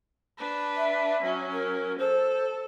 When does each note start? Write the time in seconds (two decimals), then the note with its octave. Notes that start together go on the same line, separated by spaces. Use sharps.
0.37 D4 B4
0.76 E5
1.22 F#3 C#4
1.52 A#4
1.99 A4 C5